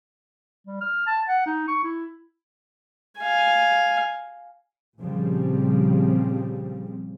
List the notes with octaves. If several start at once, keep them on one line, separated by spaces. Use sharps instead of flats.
G3
F6
A5
F#5
D#4
C#6
E4
F5 G#5
A#2 C#3 F3 G3 C4